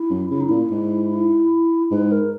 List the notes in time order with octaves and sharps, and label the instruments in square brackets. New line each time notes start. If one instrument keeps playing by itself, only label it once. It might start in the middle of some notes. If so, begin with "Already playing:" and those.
Already playing: [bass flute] E4
[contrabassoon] F#2
[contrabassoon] C#3 [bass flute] E4
[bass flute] D#4
[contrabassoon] A#2 [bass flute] E4
[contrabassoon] G#2
[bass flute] E4
[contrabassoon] G#2 [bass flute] B4
[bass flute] A#4